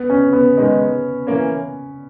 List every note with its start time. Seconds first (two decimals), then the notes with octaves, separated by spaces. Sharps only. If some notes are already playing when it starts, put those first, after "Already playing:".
Already playing: B3
0.10 C#4
0.33 B3
0.57 D#3 G#3 D#4
1.27 E3 A#3 C#4